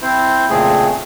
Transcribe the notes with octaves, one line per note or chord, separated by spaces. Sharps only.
C4 E4 C5
F2 A#2 C#3 A3 C4 G#4